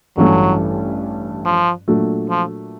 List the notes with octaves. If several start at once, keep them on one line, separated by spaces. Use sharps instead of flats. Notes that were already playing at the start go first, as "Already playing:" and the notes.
A1 G2 E3 F#3 A3 C#4
F3
A#2 F#3 A3 D4
F3